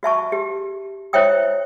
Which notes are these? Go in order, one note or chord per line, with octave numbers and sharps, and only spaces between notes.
F#4 E5 A5 C#6
G4
E4 C5 C#5 E5 G5 D#6